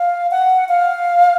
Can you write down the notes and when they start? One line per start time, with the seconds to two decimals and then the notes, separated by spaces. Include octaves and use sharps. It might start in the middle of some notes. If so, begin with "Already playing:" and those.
Already playing: F5
0.31 F#5
0.69 F5